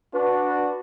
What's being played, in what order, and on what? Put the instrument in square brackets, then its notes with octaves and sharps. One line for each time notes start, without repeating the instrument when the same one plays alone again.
[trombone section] D4 F#4 [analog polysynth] B4